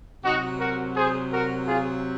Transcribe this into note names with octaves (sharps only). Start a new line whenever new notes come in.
C3 F#3 D#4 F#4
F#4 A#4
G#4 C5
F#4 A#4
F4 G#4